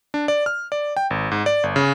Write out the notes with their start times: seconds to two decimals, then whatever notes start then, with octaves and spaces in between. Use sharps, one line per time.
0.14 D4
0.28 D5
0.46 F6
0.72 D5
0.97 G5
1.10 G#1
1.32 G#2
1.46 D5
1.63 G1
1.76 C#3